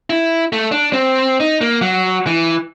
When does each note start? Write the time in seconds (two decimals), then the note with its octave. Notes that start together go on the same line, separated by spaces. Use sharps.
0.10 E4
0.53 A3
0.72 D4
0.93 C4
1.40 D#4
1.61 A#3
1.82 F#3
2.27 E3